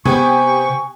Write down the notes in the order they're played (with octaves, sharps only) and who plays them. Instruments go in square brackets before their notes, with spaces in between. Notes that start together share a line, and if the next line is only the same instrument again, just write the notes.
[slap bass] C3 [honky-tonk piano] B3 G4 [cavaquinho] G#5 [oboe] C#6